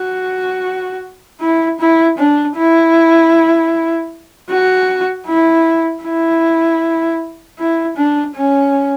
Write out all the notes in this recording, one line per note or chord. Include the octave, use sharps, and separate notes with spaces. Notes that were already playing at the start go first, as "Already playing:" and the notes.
Already playing: F#4
E4
E4
D4
E4
F#4
E4
E4
E4
D4
C#4